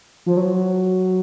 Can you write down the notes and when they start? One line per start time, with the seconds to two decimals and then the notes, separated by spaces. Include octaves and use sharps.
0.26 F3
0.37 F#3